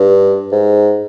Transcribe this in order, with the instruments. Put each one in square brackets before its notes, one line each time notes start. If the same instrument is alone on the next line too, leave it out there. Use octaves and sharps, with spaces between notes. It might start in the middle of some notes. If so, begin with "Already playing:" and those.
Already playing: [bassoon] G2
G#2